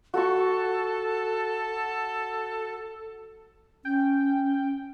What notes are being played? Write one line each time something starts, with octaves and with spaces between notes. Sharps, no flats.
F#4 A4 C#6
C#4 G5